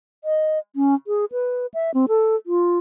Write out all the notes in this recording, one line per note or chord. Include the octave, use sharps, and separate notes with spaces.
D#5
C#4
G#4
B4
E5
C4
A4
F4